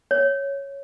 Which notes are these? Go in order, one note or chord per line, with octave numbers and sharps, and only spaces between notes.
C#5